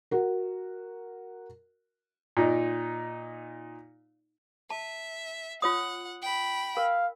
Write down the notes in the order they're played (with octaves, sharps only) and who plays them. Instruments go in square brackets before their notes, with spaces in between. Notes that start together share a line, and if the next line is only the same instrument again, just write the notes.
[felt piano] F#4 A#4
[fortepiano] A#2 D#4
[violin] E5 [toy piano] A5
[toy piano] F4 C#5 D#6 [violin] F#5
[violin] G5 B5
[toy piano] A#4 [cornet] F5